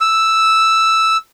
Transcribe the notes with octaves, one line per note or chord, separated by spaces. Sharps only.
E6